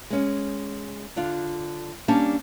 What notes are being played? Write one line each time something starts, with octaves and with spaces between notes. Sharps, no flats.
G#3 C#4
D3 D4 F4
G3 A#3 C#4 D4 A5